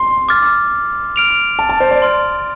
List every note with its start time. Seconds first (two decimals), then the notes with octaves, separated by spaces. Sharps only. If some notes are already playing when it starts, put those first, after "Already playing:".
Already playing: C6
0.29 D6 F6 A6
1.16 F6 D7 F7
1.59 A5
1.69 A5
1.80 C5
1.91 D5
2.02 C6 F6 A6